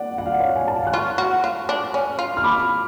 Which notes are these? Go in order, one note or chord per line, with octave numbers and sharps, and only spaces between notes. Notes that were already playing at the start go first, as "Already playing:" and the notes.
Already playing: D5 F#5
F#5
F5
D5
C#5 F5
G#5
A5
F5 G#5
F#6
F4 C#6 F6
F#4
F4
D4
C#4
F4
F6
B5 D6